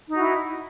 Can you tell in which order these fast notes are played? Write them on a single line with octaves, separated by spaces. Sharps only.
D#4 F#4 E4